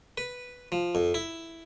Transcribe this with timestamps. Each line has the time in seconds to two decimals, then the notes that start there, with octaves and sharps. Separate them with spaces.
0.18 B4
0.72 F3
0.95 F2
1.14 E4